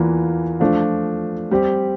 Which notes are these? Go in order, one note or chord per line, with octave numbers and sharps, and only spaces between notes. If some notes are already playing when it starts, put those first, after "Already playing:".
Already playing: E2 E3 A#3 F4
F3 A3 D4 F4
G3 C4 G4